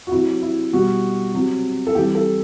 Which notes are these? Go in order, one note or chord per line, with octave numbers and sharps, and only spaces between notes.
F#4
C3 F#3 E4
E4
B2 G3 F#4
C3 F#3
A4
C3 E3 G3 G4
A4